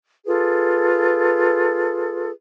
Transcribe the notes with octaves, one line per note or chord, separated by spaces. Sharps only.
F4 G#4 A4 B4